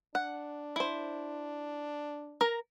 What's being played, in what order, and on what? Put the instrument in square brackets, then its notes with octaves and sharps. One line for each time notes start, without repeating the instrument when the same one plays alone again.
[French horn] D4 [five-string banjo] F#5
[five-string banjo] E4 C5
A#4 A#5